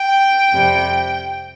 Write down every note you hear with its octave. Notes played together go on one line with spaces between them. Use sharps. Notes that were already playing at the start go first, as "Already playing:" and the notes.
Already playing: G5
F2 C3 G3